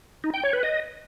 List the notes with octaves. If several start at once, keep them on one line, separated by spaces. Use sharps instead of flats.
D#4
G5
C#5
B4
D#5